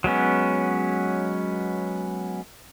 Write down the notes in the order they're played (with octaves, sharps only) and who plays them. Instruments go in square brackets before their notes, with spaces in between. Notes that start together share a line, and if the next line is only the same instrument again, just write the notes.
[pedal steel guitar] F#3 G#3 B3 C#4